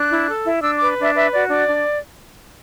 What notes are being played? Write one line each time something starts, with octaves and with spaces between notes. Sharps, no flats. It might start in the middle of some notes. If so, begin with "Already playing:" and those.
Already playing: D4 F#6
E4
A4
E4
D4 E6
B4 D6
D4 E5
B4 E5
F#4 D5
D4 D5
D4